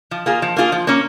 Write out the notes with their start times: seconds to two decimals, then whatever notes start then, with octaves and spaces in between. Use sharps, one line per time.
0.11 F3
0.26 A#3 F4 G#4
0.42 F3
0.56 A#3 F4 G#4
0.72 F3
0.87 A#3 C#4